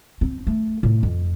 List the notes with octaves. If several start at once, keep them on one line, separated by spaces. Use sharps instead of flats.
C4
A3
A2
F2